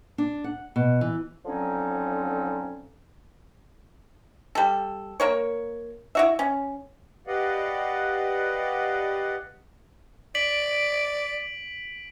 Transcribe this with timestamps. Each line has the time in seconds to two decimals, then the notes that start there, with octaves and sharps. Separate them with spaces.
0.18 D4
0.44 F#5
0.76 B2
1.01 E3
1.45 D3 F3 F#3 C4 C#4 D#4
4.55 G3 A4
5.20 A#3 A#4 C#5
6.15 E4 F#4 E5
6.39 C#4
7.27 G4 B4 D5 D#5 F5 F#5
10.35 D5 B6 D7 F#7